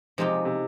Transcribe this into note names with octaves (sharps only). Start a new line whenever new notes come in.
C3 F3 G#3 C4 D#4 G4
C3